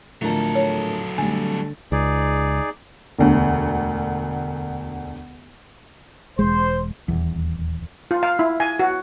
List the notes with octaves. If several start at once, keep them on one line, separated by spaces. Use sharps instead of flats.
A2 D3 F3 F#3 A3 A4 A#4
C#5
D3 G3 A3 G#5
C#2 D#4 G#4 D5
E1 D2
E1 C2 G#3 C5
D#1 E2
F4
F5
E4
G#5
F#4